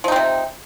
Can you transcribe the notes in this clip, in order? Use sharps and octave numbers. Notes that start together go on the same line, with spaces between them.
C3 F3 C4 D#4